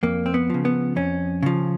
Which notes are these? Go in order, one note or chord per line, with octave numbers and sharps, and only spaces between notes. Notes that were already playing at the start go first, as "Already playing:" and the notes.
F2 A#3
C4
B3
C#3 F3
B3
F2 C#4
C#3 F3